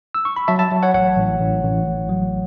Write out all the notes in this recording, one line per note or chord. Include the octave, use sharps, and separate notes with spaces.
E6
C#6
B5
F#3 E5 A5
E5 A5
F#3
C#5 F#5
A1 C#5 F#5
A1
A1
A1
A1
F#3